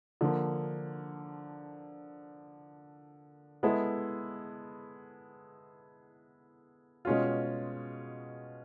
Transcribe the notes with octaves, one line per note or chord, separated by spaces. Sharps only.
D3 F3 A#3
G#3 B3 E4 A4
B2 G#3 C#4 F4